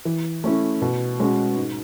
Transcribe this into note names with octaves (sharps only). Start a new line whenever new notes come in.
E3
A3 C#4 E4
B2
G#3 C#4 F#4
G#2